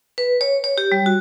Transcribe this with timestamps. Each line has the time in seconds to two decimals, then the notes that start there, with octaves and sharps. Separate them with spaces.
0.18 B4
0.41 C#5
0.64 C#5
0.78 G4
0.92 G3
1.06 F#4